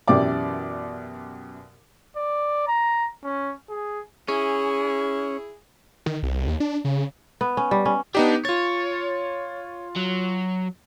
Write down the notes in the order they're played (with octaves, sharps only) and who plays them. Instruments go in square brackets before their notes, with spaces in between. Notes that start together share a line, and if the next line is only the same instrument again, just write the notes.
[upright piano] F#2 B2 E3 G4 D5 D6
[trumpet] D5
A#5
C#4
G#4
[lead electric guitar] C#4 [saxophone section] E4 G#4
[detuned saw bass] D#3
C2
D#2
D4
C#3
[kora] B3
C#4
G3
C#4
[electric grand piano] B3 D#4 G4 [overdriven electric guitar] D4
[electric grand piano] F4 A6 [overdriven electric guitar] C#5
[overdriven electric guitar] F#3